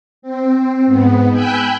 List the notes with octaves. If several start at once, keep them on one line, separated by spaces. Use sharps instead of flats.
C4
G#2 B3
G5 G#5 B5 E6 F#6 G6